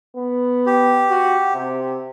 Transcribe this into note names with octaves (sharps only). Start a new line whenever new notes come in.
B3
G4
F#4
C3